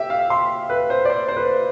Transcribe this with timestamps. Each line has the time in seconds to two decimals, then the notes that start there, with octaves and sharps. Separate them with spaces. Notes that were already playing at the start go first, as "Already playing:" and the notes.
Already playing: G4 E5
0.10 F5
0.30 C6
0.70 B4
0.90 C5
1.05 D5
1.10 C5
1.28 C5
1.36 B4